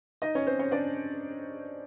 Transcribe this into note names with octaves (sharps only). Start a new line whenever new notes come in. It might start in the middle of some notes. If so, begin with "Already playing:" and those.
D#4 D#5
C#4 C#5
C4 C5
C#4 C#5
D4 D5